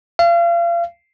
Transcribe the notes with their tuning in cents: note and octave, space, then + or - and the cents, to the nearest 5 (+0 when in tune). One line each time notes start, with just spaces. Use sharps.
F5 -35